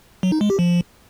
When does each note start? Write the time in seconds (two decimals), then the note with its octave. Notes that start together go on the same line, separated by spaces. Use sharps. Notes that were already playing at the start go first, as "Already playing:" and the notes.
0.23 F#3
0.32 D#4
0.41 G#3
0.50 G4
0.59 F3